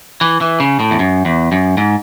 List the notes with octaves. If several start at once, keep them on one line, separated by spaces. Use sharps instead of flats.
E3
E3
C#3
A2
E2
F#2
E2
F#2
G#2